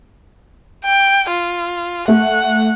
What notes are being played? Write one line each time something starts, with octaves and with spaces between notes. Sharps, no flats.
G5
F4
A3 F#5